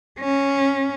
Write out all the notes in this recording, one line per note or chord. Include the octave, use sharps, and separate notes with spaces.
C#4